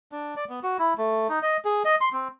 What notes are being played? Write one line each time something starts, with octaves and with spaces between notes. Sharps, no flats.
D4
D5
B3
F#4
E4
A3
D#4
D#5
G#4
D#5
C6
C4